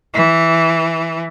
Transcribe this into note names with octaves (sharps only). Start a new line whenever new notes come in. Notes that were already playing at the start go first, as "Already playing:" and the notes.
E3